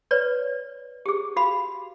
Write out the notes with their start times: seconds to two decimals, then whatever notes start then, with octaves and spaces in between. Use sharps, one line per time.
0.11 B4 C#5 D5
1.06 G4 G#4
1.36 F#4 F5 B5